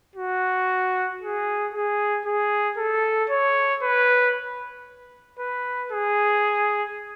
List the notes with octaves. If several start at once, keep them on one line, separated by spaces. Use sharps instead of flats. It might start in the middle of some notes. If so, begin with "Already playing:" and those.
F#4
G#4
G#4
G#4
A4
C#5
B4
B4
G#4